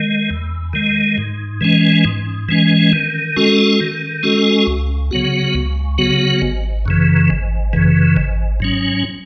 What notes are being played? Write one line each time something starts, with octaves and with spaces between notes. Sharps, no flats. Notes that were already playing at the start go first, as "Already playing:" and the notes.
Already playing: D#3 G#3
E2
D#3 G#3
G#2
E3 G#3 C#4
G#2
E3 G#3 C#4
D#3
G#3 C#4 F#4 A4
D#3
G#3 C#4 F#4 A4
C#2
C#3 F#3 B3 F#4
C#2
C#3 F#3 B3 F#4
G#1
F#2 C#3 E3
G#1
F#2 C#3 E3
G#1
G#2 F#3 C#4